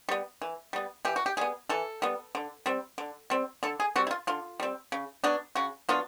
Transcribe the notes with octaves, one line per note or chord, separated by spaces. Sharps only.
G3 B3
E3
G3 B3
E3 G4
F#4
G4
G3 B3 G#4
E3 A4
G3 B3
D3
G3 C4
D3
G3 C4
D3 A4
G#4
G3 C4 F#4
E4
F4
D3 F4
G3 C4
C#3
F#3 B3 D4
C#3 F#4
F#3 B3 D4 F4